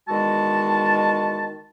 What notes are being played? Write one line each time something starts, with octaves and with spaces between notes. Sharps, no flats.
E2 D#3 G#3 F#4 A5